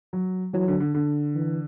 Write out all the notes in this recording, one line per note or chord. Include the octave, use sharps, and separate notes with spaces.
F#3
E3 F#3
D3
D3
D3
E3